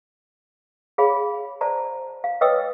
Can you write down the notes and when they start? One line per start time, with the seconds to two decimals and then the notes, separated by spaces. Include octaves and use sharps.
0.98 G#4 C#5 F5 B5
1.61 C5 D5 A5 A#5
2.24 F5
2.41 B4 C#5 D#5 G5 D#6 E6